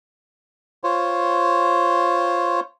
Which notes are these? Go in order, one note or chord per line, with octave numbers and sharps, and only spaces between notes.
F4 C5 C#5